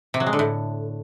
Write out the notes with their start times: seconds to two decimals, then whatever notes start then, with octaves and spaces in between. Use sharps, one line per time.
0.14 C3
0.20 F#3
0.27 G#3
0.33 D3
0.39 A2